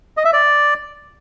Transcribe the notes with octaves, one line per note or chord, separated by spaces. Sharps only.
D#5
E5
D5